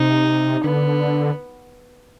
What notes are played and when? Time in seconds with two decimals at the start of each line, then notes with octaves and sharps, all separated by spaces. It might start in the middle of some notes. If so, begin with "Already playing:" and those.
Already playing: C3 D#4
0.64 D3 B3